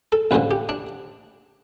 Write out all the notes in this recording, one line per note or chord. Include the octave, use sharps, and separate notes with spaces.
A4
A1 G2 D3 F3 B4
G4
D4